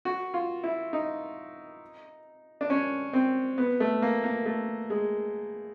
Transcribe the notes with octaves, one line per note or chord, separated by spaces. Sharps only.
F#4
F4
E4
D#4
D4
C#4
C4
B3
A3
A#3
A#3
A3
G#3